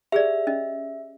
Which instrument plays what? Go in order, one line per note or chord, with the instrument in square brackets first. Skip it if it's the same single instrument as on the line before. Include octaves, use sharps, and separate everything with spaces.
[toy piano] G4 G#4 D5 [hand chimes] E5
[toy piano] C#4 D#5